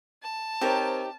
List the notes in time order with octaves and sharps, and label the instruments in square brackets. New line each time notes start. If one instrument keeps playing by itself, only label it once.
[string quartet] A5
[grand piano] C4 A#4 C#5 [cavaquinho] D#4 G4 [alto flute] C5